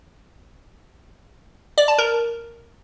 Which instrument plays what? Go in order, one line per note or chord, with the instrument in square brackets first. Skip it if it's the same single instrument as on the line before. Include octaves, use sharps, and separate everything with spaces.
[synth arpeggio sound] D5
A5
A#4